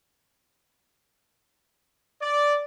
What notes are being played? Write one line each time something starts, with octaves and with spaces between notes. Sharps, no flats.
D5